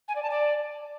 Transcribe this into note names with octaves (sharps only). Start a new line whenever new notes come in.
G#5
D5
A5
D5